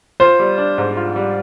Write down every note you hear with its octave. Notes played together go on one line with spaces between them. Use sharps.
F4 C5
G3
D4
G#2
F4
G3